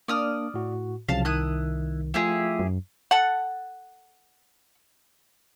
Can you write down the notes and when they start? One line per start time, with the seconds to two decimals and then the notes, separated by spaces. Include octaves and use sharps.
0.08 A#3 D4 D5 D#6 F6
0.54 A2 F#4
1.09 C2 C#3 F3 F#3 F5 A5
1.25 D#3 E4 D#6 F#6
2.14 F3 A3 E4 F4 G4 G#4
2.59 F#2
3.11 A4 F#5